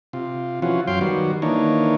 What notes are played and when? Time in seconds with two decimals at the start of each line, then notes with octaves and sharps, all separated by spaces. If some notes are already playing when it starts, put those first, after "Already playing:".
0.13 C3 F4
0.62 E3 F3 C#4 F4 F#4
0.88 F#2 F#3 F5 G5 C6
1.01 D#3 F#3 G3 B3 F#4
1.42 D#3 E3 A#3 D4 D#4 C#5